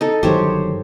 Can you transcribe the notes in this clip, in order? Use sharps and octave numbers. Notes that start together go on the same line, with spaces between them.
D#4 A4
G1 D#3 F#3 G4 C5 C#5